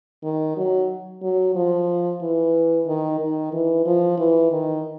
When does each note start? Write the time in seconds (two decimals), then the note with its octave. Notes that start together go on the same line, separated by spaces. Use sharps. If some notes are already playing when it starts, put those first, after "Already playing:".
0.23 D#3
0.57 F#3
1.22 F#3
1.55 F3
2.21 E3
2.87 D#3
3.19 D#3
3.53 E3
3.85 F3
4.18 E3
4.52 D#3